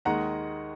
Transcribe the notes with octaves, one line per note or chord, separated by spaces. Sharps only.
D#2 D#3 G#3 F#5 A#5